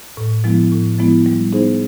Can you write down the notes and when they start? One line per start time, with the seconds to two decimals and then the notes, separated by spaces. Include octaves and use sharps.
0.17 A2
0.44 F3 G#3 B3 E4
0.71 A2
0.98 F3 G#3 B3 E4
1.26 G3
1.53 B3 D#4 G#4 C5